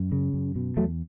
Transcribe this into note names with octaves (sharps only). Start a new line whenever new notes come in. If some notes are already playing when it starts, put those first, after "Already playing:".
Already playing: F#2
C#3
F#2
B2
E2 F#3 A3